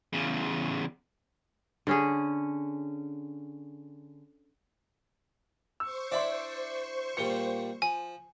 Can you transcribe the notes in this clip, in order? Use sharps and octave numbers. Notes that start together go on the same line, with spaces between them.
E2 C#3
D3 C#4 G#4
C5 C#6 E6
D4 E4 D5 E5 C6
A#2 G3 C#7 G7
F3 G#5